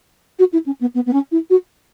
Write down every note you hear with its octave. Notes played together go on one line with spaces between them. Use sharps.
F#4
E4
C#4
B3
B3
B3
C#4
E4
F#4